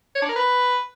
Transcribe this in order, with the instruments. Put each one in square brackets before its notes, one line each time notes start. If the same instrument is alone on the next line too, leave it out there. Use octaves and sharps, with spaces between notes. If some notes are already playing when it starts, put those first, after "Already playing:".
[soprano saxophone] C#5
D4
A#4
B4